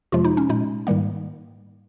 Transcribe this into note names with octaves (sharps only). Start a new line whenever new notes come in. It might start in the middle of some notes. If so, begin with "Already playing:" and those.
F2 C3 F3 G#3 F4
D#4
C#4
A#2 G#3 D#4
G#2 D#3 G3 A#3